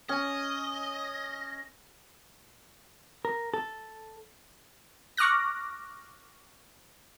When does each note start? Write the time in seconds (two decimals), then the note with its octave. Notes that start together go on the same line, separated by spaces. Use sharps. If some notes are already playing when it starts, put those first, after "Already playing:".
0.09 C#4 D#5
3.25 A#4
3.54 A4
5.17 C#6 D6 F6 F#6 A#6